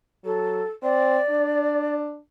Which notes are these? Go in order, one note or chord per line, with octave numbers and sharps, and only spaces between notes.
F#3 A4
C4 D5
D4